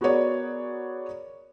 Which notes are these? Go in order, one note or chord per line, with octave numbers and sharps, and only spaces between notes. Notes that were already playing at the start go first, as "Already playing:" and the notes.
B3 F#4 G#4 A#4 C#5 D5